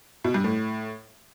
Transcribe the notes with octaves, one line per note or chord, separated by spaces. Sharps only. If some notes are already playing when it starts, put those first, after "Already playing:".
B2
G2
A2